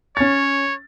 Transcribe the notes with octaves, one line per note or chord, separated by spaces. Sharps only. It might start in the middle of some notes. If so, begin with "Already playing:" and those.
C#4 C#5 A6